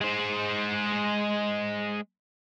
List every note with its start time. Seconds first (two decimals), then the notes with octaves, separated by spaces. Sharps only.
0.01 G#3 C5